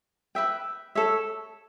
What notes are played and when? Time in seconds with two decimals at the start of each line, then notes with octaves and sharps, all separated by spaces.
0.35 B4 E5 G5
0.95 A4 C#5 E5